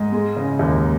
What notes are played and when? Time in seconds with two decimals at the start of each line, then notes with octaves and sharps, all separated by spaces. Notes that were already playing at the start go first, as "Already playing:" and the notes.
Already playing: G#2 D#5
0.12 G#3
0.37 C#3
0.59 D#2